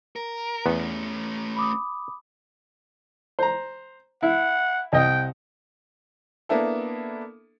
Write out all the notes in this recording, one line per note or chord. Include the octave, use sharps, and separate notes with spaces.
A#4
E2 A3 B3 C#4
B5 D6 D#6
C5 A#5
E4 F#5
C2 D#5 G5
A#3 B3 D4 E4 A4